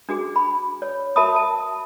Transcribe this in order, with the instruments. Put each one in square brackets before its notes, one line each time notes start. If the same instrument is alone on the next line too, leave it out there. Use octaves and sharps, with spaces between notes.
[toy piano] D4 F#4 G#4
B5
C#5
F#4 A#4 E5 A5 B5 D#6
A5